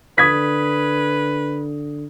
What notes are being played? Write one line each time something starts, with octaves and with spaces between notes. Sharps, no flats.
D3 B4 D#6 G#6 B6